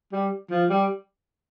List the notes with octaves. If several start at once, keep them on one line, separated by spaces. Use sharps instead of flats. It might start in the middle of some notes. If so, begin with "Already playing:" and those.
G3
F3
G3